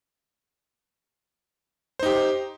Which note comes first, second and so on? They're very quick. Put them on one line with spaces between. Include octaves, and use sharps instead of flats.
C5 D#4 G4